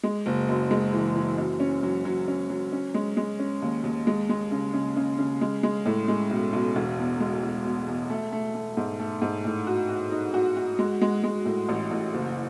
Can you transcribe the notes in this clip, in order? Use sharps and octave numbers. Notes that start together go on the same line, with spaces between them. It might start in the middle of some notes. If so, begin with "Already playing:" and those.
G#3
F#1
F#2
G#3
E3
E3
F#2
C#4
F#3
F#3
C#4
F#3
C#4
G#3
G#3
C#4
D#2
D#2
G#3
G#3
C#3
C#3
C#3
C#3
G#3
G#3
A2
G#3
B1
B1
E1
E2
G#3
E2
B2
E2
A3
A3
A3
G#2
A3
G#2
A2
F#4
F#4
D#4
F#4
F#4
G#3
G#3
G#3
A2
A1
A1
F#1